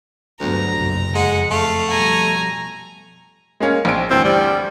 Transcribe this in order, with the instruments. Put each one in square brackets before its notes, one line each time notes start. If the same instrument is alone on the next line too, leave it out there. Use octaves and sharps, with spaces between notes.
[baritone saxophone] D2 [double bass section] G2 F#3 B3 [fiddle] A#5
[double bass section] F#1 B1 C3
[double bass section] F2 [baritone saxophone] G#3 [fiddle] F#5
[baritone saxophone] A3 [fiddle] F5
[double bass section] B2 F3 G3 [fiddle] G#5 A#5
[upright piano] G#3 A#3 C#4
A#1 C4 D7
[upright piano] D2 G2 E3 [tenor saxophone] C4
[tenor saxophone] G3